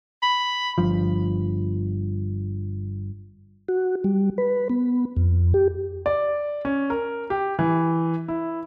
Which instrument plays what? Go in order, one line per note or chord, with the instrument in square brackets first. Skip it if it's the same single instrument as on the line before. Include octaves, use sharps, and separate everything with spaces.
[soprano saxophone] B5
[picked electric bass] G1 G2 F3
[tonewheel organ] F#4
G3
B4
B3
F2
G4
[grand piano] D5
C#4
A#4
G4
E3
E4